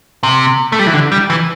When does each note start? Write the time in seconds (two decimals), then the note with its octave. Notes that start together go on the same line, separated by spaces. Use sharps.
0.23 C3
0.72 A3
0.79 G3
0.87 E3
0.94 D3
1.12 G3
1.30 E3